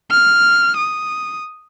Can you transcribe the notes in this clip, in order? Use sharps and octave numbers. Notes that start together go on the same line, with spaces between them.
F6
D#6